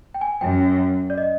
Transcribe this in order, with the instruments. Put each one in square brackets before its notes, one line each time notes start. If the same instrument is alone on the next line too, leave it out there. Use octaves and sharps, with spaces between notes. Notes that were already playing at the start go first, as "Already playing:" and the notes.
[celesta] G5
G#5
[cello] F#2 [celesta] G5
[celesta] D5
D#5